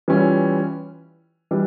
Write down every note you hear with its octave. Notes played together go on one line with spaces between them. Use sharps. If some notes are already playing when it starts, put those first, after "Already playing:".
E3 G3 C#4 F4
E3 G3 D4